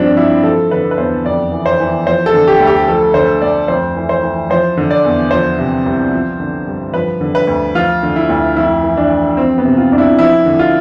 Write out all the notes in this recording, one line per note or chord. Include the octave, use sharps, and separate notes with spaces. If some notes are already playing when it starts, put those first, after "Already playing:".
Already playing: G2 F3 C4 D4
F3 E4
F3 A4
D3 B4
B4
E2 C5
F2 D5
E3
C5
E3
F3 C5
A4
D3
G4
D2
G4
F3 A4
D3 C5
D2 D5
F2 C5
E3
C5
E3
F3 C5
D3
D5
E2
F3 C5
C3
C2
F3
D3
G2
F3 B4
D3
B4
D2
F3 F4
D3
E4
D2
F2 E4
E3
D4
E3
F3 C4
B3
C3
F4
C2 D4
E4
F3 E4
D3
F4